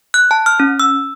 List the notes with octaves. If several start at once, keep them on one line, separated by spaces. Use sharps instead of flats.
F#6
A5
F6
C#4
E6